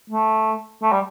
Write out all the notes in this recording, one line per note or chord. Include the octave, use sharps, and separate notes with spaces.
A3
A3
G3